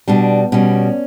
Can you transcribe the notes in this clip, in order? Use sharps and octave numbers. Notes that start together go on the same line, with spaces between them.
B2 G3 D4
B2 G3 C#4